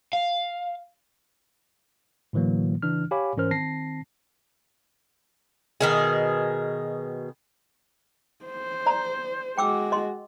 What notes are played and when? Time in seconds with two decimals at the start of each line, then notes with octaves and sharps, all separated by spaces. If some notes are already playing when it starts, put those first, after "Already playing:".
0.13 F5
2.33 A2 D3 E3 F#3 A#3
2.82 C#3 E3 D4 F6
3.11 G4 C#5 F5 G#5 B5 D6
3.37 G#2 E3 C#4 A#4 C5 F6
3.51 D#3 C4 A5 A#6 C7
5.81 B2 D#3 G#4
8.45 C5
8.86 D5 A#5
9.58 G#3 F#4 G5 D6 E6
9.92 D#5 C6